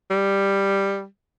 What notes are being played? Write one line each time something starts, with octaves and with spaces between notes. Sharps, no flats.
G3